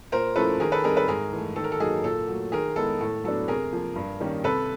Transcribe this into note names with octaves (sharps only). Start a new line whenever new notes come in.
A#2 A#4 C5
F3 A3 C#4 E4 A4 B4
D#3 G#4 A#4
A4 B4
G3 C4 D#4 G#4 A#4
A4 B4
G#2 G#4 A#4
E3 A3
D#3 A4
A#4
A4
F#3 A#3 D#4 G#4
A#2 A4
F#3 A3
D#3 G#4 A#4
G#3 B3 E4 A4
A2 A4
F#3 B3 D4 A4
C3 G#4 A#4
F3 A#3
G2
D#3 G3 A#3 C#4
C3 A4 B4